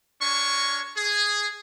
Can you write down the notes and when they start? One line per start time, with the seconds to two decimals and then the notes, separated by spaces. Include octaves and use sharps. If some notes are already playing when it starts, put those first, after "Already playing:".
0.21 D4 A#4 C#5 G#5 C#6
0.96 G#4